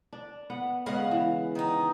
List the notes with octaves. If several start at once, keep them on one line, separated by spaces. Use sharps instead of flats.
D4
B3 F#5
C#3 G#3 B3 F5 F#5
E3
D#3 D#4